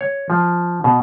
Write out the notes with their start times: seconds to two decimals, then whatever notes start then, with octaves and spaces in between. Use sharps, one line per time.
0.01 C#5
0.30 F3
0.84 B2